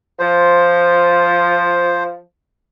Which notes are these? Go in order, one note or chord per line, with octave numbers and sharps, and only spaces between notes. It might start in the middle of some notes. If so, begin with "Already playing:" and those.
F3 C5